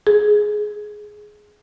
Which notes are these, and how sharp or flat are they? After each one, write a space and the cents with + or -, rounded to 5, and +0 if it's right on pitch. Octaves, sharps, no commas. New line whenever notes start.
G#4 +10